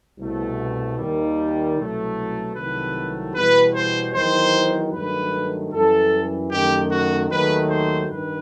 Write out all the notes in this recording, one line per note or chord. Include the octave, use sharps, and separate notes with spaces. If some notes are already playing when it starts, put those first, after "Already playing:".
C2 B2 A3
D#2 D#3 G3
C2 B2 F#3 A3
C2 C3 D#3 F#3 A3 B4
E2 B2 G3 B4
C5
E2 D#3 F#3 C5
G2 D#3 F#3 A3 B4
F#2 E3 G3 A4
F#2 D#3 A3 G4
F#4
D#2 D#3 F#3 A3 B4
C5
G2 D#3 B4